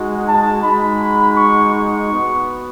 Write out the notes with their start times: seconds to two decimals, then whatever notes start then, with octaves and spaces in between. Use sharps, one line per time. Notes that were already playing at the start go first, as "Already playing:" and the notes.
Already playing: G#3 D#4 F#4
0.28 A5
0.63 G#3 D#4 F#4 B5
1.37 C#6
1.74 C#6
2.11 B3 F#4